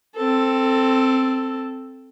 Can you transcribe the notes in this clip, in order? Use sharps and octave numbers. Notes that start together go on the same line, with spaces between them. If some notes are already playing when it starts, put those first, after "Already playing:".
C4 A4